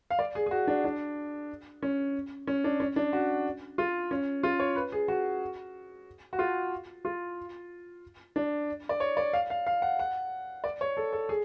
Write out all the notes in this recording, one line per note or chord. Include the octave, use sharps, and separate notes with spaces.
F5
D5
G#4
G#4
F#4
D4
D4
C#4
C#4
D4
C#4
D4
F#4
F4
C#4
F4
C#5
B4
G#4
F#4
F#4
F4
F4
D4
D5
C#5
D5
F5
F5
F5
F#5
F#5
D5
C#5
A4
A4
G#4